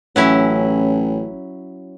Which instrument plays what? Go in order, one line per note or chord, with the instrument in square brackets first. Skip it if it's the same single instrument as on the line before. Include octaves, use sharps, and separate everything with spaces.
[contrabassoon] A1 [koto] F#3 C#4 E4